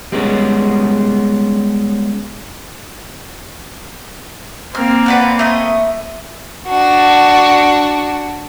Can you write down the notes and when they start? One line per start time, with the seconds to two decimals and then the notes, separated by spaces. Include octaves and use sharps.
0.12 G3 G#3 B3 C#4
4.75 A#3 C4 F6
5.06 B4 D5 F#5
5.39 A3 D#5
6.68 D4 F#4